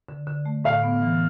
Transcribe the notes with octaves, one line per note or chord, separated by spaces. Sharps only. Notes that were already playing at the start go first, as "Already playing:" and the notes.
D3
D3
A3
A2 F5
B3
E3